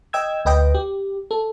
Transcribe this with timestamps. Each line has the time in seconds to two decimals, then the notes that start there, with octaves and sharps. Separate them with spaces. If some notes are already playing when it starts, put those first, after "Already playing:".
0.13 D#5 G5 E6 G#6
0.45 D2 B4 D#5 G5
0.75 G4
1.31 A4